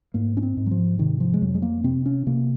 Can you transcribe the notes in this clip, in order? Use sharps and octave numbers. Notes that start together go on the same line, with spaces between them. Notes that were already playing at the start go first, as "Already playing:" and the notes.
G#2 A#3
C#4
C4
G#2
F#3
F3
C3 D#3
F3
G#3
F2 F#3
G#3
A#3
C3 C4
C#4
C3 A#3